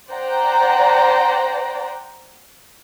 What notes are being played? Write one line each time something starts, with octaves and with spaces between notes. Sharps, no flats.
C5 D5 F#5 G5 A#5